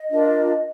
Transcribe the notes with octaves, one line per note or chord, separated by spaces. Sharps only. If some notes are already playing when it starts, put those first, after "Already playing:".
Already playing: D#5
D4 F4 A#4